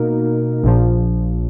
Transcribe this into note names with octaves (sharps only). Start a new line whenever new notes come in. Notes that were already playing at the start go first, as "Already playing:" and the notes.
Already playing: B2 A#3 D#4 A#4
A#1 A#2 F3